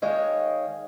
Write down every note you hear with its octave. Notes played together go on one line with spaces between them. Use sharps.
D#3 G#3 C#5 D#5 F5